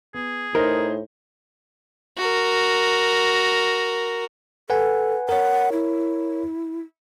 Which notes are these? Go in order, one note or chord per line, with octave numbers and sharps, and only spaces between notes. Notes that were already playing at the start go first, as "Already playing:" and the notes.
B3 G#4
A2 D#4 A#4 C5
F#4 A#4
A4 B4 F#5 G#5
A#4 C#5 F#5
E4